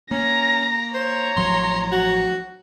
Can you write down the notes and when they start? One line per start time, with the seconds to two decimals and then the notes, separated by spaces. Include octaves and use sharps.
0.11 A#3 C#4 A#5 A#6
0.94 C5 C#5 A#5
1.37 A1 F3 F#3 C6
1.92 F#4